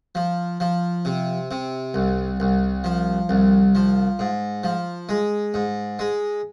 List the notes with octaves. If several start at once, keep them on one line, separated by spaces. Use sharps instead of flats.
F3
F3
C3
C3
C2
C2
F3
C2
F3
G#2
F3
G#3
G#2
G#3